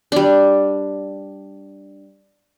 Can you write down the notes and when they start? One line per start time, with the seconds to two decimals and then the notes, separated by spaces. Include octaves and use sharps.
0.12 G3 D4